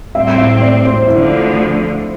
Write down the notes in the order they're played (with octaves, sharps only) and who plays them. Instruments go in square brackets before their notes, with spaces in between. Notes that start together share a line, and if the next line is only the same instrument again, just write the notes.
[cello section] A2 G3 C4 [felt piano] E5
[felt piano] E5
D5
C5
[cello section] D2 D3 F3 [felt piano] E4